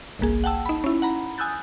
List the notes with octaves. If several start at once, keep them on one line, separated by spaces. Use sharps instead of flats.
G1 C2 A#3 G#4
F#5 G5 A5 E6
D#4 B5
C#4 E4
F#5 A#5 B5
G#5 D#6 E6 F#6 G6 A6